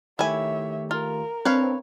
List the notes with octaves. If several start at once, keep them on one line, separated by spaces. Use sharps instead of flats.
D#3 A3 E4 G4 C#5 E5 G#5
F4 A#4
C4 D4 B4 C#5 F5